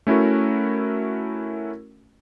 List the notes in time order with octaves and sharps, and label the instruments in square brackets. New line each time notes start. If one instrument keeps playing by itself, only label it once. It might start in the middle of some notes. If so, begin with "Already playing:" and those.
[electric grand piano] A3 C#4 E4 F#4 A#4